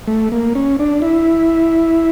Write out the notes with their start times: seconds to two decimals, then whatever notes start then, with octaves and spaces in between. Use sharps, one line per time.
0.07 A3
0.32 A#3
0.55 C#4
0.79 D4
1.02 E4